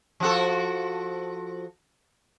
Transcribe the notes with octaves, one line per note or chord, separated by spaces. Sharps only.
F3 F#4 A4